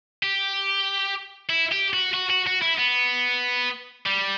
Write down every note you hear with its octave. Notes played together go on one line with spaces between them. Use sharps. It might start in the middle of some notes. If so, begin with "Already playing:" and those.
G4
E4
G4
F#4
F#4
F#4
F#4
E4
B3
G3